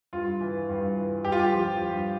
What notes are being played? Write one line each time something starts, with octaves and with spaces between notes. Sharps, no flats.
G2 F4
E3
G2
E3
G2 G4
F4
G4
F3
G2